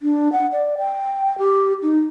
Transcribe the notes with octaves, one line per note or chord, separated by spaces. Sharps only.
D4
F#5
D5
G5
G4
D#4